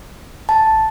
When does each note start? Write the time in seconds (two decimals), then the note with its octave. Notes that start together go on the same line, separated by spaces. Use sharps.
0.49 D1 A5
0.71 G#1